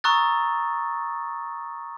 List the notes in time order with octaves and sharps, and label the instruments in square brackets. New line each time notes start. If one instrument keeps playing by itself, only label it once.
[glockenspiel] A#5 C#6 D#6 E6 F#6 A6